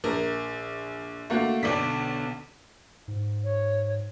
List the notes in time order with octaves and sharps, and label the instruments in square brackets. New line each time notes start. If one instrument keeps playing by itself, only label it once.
[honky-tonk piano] A#1 [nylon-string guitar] A#4
[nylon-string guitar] D3 [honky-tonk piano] A3 A#3 F#4
[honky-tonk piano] B1 D5 B6 [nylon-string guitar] B2 D3
[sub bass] G#2
[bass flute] C#5